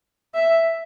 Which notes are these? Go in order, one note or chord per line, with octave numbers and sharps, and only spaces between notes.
E5